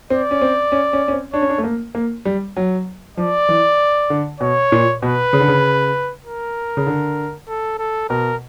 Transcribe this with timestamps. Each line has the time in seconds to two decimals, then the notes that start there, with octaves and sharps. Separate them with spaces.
0.10 C4 D5
0.31 C#4
0.41 C4
0.72 C#4
0.93 C#4
1.08 C#4
1.12 C4
1.33 D4 C#5
1.42 C#4
1.49 D4
1.58 A3
1.64 A#3
1.95 A#3
2.25 G3
2.56 F#3
3.17 F3 D5
3.49 E3
4.10 D3
4.40 B2 C#5
4.72 A#2
5.02 B2 B4
5.33 C#3
5.40 D3
5.48 C#3
6.25 A#4
6.77 C#3
6.87 D3
7.48 A4
7.79 A4
8.09 B2 A#4